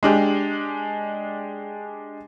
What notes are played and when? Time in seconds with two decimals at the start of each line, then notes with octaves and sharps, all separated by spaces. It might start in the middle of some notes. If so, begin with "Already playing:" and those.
0.03 G#3 D4 G4